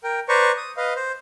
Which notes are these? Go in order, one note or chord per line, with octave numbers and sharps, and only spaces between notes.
A#4 G5
B4 C5 D5 A#5 C#6
D#6
B4 D#5 F5
C5